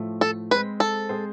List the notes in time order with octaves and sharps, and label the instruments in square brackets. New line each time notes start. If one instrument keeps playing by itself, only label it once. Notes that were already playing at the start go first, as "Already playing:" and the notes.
Already playing: [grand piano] A2 F3 A3
[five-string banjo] A4
[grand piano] G#3 C4 G#4 C5 [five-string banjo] B4
[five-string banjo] A4
[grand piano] G#3 C4 G#4 C5